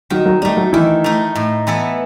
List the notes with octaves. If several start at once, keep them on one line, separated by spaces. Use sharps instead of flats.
D#3 F#3 F#4
F#3 F#4
G3 A3 D#4 G4
F#3 F#4
D#3 E3 E4
A3 D#4
A2
E3 B3 E4 A4